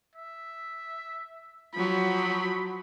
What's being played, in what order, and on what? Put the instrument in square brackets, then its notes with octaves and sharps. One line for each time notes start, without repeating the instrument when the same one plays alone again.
[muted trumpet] E5
[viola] F3 F#3 [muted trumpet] B5